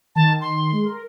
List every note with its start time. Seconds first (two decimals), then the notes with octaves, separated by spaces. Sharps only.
0.16 D#3 A5
0.41 C6
0.72 G#3
0.85 A#4